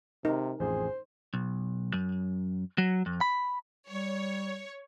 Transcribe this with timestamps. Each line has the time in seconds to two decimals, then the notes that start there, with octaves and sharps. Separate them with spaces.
0.25 C3 D#4 A#4
0.60 A1 F2 G#4 C5
1.34 B1
1.94 F#2
2.78 F#3
3.06 F2
3.21 B5
3.89 G3 C#5